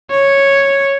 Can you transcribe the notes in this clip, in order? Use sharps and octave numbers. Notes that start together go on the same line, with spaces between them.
C#5